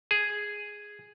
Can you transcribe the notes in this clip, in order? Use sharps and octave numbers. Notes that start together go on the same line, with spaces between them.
G#4